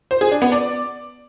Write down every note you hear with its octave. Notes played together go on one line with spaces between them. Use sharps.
C5
G#4
D4
B3
D5